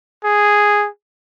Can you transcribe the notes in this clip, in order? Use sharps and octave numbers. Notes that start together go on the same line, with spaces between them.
G#4